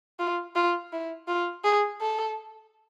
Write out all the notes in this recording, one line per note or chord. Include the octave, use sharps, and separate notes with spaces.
F4
F4
E4
F4
G#4
A4